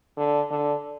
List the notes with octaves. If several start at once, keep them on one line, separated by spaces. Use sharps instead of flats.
D3
D3